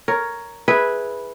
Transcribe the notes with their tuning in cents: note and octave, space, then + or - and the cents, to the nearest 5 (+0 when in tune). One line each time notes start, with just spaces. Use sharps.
A#4 +0 C#5 +10
E4 -5 G#4 +0 B4 -5